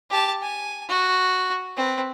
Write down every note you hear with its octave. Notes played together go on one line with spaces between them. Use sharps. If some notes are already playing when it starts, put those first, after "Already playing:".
G4 A5
G#5
F#4
C4 B4